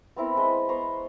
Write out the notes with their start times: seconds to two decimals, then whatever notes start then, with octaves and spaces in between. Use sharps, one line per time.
0.16 B3 C4 E4 A#4
0.37 G#3 D#5 B5
0.69 B3 C5 A#5 C#6